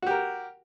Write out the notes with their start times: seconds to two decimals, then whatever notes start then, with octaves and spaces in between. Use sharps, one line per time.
0.02 F#4
0.07 G4
0.11 A#4